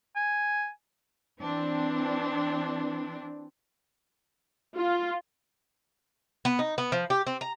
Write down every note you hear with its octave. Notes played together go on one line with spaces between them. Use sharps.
G#5
E3 C4 D4
F4
B3
D#4
B3
F3
G4
C4
A#5